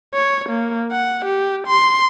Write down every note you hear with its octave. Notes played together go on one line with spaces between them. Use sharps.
C#5
A#3
F#5
G4
C6